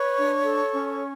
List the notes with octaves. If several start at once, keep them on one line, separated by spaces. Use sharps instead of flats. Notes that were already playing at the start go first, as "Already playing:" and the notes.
Already playing: B4 C#5 C#6
D4
A4
C#4